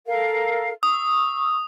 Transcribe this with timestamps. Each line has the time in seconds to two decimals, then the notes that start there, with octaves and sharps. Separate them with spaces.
0.06 A4 A#4 F5
0.83 C#6 D#6 E6